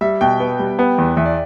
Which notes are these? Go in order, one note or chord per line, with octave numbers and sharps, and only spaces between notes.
G3 E5
B2 G5
B3
G3
B3
E2
E2 E5
D5